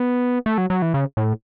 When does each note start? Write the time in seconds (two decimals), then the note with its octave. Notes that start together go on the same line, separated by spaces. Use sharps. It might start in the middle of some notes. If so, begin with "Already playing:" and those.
Already playing: B3
0.46 A3
0.58 F#3
0.70 F#3
0.82 E3
0.94 C#3
1.17 A2